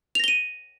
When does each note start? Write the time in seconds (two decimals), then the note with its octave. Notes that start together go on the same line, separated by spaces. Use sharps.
0.15 F7
0.20 A#6
0.24 G7
0.28 D#7